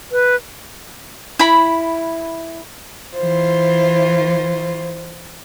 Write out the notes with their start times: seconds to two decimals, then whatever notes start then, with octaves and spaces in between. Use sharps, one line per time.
0.12 B4
1.39 E4 B5
3.15 E3 F4 C5